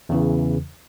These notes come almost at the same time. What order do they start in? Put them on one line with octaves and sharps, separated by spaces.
E2 C#3 E3